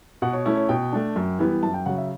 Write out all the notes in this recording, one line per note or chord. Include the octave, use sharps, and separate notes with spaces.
B2 F#5
C#5
A3 C#4 E4
C#5
B2 G5
A3 D4
F#2
E3 G3 B3
F#2 A5
G5
C#3 F#3 F#5
E5